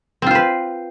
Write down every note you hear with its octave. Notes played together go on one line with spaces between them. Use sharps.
C4 F4 B4 C5